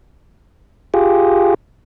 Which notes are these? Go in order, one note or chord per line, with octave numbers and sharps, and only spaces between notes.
F4 G4 G#4